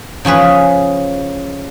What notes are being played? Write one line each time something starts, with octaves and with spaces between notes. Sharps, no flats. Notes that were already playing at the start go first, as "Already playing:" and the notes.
C#3 F3 G#4 B4